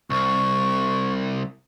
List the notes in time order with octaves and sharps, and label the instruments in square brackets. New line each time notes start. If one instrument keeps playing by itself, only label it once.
[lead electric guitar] C2 [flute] C#6